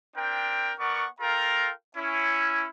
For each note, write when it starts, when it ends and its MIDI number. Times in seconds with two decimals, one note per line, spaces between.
0.17 0.73 60
0.17 0.73 62
0.17 0.73 70
0.17 0.73 79
0.80 1.07 59
0.80 1.07 70
0.80 1.07 74
0.80 1.07 78
0.80 1.07 85
1.21 1.70 65
1.21 1.70 69
1.21 1.70 70
1.21 1.70 77
1.21 1.70 79
1.21 1.70 82
1.97 2.66 61
1.97 2.66 64